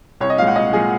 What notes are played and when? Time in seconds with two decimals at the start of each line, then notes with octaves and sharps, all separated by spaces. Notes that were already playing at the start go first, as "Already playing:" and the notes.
0.20 C2 C#5
0.30 D#5
0.38 A#2 F5
0.42 G#3
0.47 F#5
0.55 C2 D#5
0.73 A#2 G#3 G#4